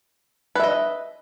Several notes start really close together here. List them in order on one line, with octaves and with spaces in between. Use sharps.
B4 E5 D#5